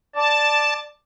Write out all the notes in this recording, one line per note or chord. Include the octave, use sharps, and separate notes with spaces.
D5 A5